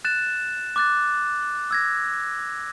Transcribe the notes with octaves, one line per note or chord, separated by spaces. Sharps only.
F#6 A6 E7
D6 F#6 A6
E6 G#6 A#6